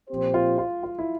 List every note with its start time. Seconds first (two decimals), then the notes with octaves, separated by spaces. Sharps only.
0.09 A#2 F3 C4 G4 C5
0.34 F4
0.58 F4
0.83 F4
0.99 E4